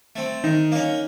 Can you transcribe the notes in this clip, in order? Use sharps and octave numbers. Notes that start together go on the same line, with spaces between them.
A3 C4
D#3 D#4
A#3 C#4